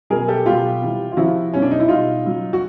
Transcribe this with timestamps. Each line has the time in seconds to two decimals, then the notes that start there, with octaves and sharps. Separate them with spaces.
0.10 B2 F#3 G#4 A#4
0.28 G4 A4
0.45 B2 F#3 F4 G4
0.81 C3 E3 G3
1.12 F4
1.17 C3 F3 E4 F#4
1.53 B2 F#3 C#4
1.62 D4
1.71 D#4
1.79 E4
1.88 B2 G3 D#4 F4
2.24 C#3 F#3
2.53 F#4